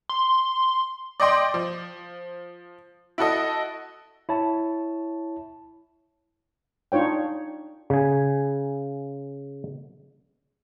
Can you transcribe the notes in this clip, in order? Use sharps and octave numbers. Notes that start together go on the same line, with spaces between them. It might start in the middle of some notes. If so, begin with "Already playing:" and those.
C6
D5 D#5 G5 C6 D6
F3
E4 F#4 A4 D#5
E4 C#5 A5
D4 D#4 F4 C#5 G5
C#3 G#5